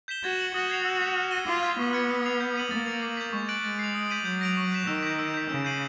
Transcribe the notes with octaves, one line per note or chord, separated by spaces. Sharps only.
G6 B6 E7 G7
F#4 G#6
C#7 F#7
F#4 D#6
G#6 C7 F7
E6
G6 B6
F6
A#6 D#7 G7
F4 D6
F6 G#6 B6
B3 C#6
F6 G#6 C#7
D#6
G#6 C7 F7
G6
B6 D#7 F#7
A#3 A6
C#7 F7
D6
G6 B6
G#3 C#6
F#6 A6 D7 F#7
G#3 A6
C7 F7
D#6
G6 B6 D#7 F#7
F#3 G6
A#6 D7 F7
C#6
F#6 B6 E7
D#3 E6
G6 B6
E6
G6 B6
C#3 E6
G6 C7 D#7 F#7